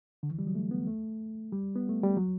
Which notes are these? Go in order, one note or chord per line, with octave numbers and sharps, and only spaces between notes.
D3
E3
G3
F#3
A3
B3
A3
G3
B3
A3
G3
F#3